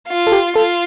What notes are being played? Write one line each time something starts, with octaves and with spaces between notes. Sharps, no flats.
F4
A4
G4
F4 A4